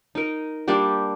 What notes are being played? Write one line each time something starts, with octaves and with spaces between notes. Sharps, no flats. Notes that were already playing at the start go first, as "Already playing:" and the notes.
D#4 A#4
G3 A#3 D4 G4